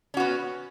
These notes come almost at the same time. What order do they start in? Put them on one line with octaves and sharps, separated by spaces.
C#4 F#4 B3